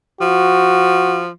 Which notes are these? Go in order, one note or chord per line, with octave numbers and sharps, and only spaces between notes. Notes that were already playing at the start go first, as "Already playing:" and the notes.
F3 F#4